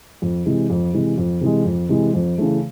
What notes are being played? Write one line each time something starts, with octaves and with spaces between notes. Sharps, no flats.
F2
C3 E3 G#3
F2
C3 E3 G#3
F2
C3 E3 G#3
F2
C3 E3 G#3
F2
C#3 E3 A3